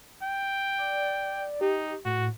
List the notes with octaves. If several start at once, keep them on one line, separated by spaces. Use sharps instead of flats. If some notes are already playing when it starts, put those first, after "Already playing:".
G5
D5
D#4 G4
A2 F#4